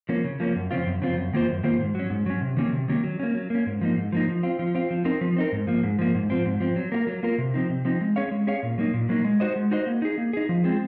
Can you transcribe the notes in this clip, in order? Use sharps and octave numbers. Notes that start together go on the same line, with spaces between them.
F3 A#3 C#4
C#3
F3 A#3 C#4
F#2
C#3 F3 C4 F4
F#2
C#3 F3 C4 F4
F#2
D#3 A#3 F4 C5
F#2
D#3 A#3 F4 C5
G#2
F#3 C#4
G#2
F#3 C#4
C3
D#3 F#3 A#3 C#4
C3
D#3 F#3 A#3 C#4
F#3
A#3 C#4
F#3
A#3 C#4
G#2
F3 A#3 D#4
G#2
F3 A#3 D#4
F3
C4 F4
F3
C4 F4
F3
C4 D#4 A#4
F3
C4 D#4 A#4
G#2
F3 A#3
G#2
F3 A#3
G#2
F3 C4
G#2
F3 C4
F#3
A#3 F4 A#4
F#3
A#3 F4 A#4
C3
F3 C4 D#4
C3
F3 C4 D#4
G#3
C#4 G#4 C#5 F5
G#3
C#4 G#4 C#5 F5
A#2
F#3 A#3 D#4
A#2
F#3 A#3 D#4
G#3
D#4 F#4 C5 D#5
G#3
D#4 F#4 C5 D#5
A#3
D#4 G#4
A#3
D#4 G#4
F3
G#3 C4 F4 G#4